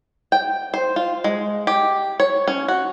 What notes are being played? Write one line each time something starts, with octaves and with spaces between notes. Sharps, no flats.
G5
C5
F4
G#3
G4
C#5
C#4
F#4